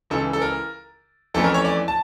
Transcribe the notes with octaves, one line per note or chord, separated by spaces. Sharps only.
C#2 C#3 E3 A4
A4
A#4
F2 E3 A3 C#4 A4
A#4
C#5
D5
A5